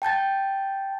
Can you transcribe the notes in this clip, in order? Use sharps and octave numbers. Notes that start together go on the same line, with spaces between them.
G5 A5 G6 A6